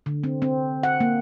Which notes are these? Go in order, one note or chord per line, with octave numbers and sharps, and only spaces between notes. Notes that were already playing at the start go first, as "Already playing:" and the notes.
D3
C4
C4
F#5
A#3